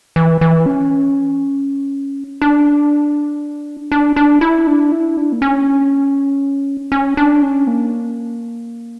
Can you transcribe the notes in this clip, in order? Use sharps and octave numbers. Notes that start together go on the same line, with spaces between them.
E3
E3
C#4
D4
D4
D4
E4
D4
E4
D4
A#3
C#4
C#4
D4
C#4
A#3